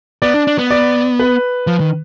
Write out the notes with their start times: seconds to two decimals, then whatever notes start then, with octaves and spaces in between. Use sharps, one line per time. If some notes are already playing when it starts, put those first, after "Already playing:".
0.22 B3 D5
0.34 D4
0.47 D4
0.58 B3
0.70 D5
1.20 B4
1.67 F3
1.80 D#3